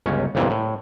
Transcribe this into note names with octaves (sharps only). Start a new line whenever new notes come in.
G1 C#2 C#4
G1 C2 F2 A#2 E3
A2